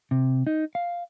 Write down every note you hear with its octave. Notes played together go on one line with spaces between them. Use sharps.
C3
D#4
F5